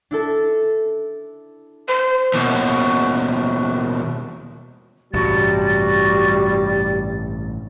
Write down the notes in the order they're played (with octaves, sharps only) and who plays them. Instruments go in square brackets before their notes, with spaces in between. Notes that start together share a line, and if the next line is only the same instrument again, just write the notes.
[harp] D4 E4 A4
[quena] C5
[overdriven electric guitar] D#2 B2
[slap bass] A1 G2 C3 [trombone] G3 [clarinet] F#4 [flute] A6